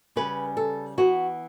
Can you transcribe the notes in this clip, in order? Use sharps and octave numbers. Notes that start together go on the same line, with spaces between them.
C#3 G3 C#4 B4
A4
E3 B3 F#4